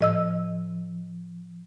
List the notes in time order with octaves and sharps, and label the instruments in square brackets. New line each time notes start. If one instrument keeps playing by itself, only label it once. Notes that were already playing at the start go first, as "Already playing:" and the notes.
[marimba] A2 D#5 E6 [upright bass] F3